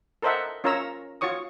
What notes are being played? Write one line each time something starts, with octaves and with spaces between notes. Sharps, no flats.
A4 A#4 C5 D#5 E5 F#5
C#4 F4 A#4 C#5 A#5 E6
F4 F#4 C#5 C#6 D#6